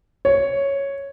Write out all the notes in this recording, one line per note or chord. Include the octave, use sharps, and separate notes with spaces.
C#5